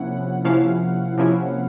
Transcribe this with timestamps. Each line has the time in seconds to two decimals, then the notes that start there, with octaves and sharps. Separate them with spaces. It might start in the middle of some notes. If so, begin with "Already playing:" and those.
Already playing: C3 F3 A#3 C#4 E4 F#5
0.45 C3 F3 A#3 C#4 E4 F5
1.18 C3 F3 A#3 C#4 E4